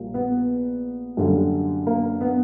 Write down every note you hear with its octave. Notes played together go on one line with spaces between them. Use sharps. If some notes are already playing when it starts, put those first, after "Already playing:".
Already playing: A#1 A#2 G3 A#3
B3
F#2 D3 G3 A#3
A#3
B3